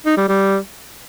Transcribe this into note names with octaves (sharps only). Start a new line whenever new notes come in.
D#4
G3
G3